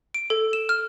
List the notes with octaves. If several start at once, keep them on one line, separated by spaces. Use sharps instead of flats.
D7
A4
E7
F6